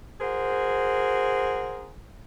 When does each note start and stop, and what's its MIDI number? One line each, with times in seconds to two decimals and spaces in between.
0.21 1.91 66
0.21 1.91 68
0.21 1.91 70
0.21 1.91 72